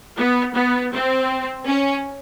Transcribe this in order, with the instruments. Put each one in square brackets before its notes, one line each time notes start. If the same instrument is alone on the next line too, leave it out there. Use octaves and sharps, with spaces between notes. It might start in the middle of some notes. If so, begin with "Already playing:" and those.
[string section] B3
B3
C4
C#4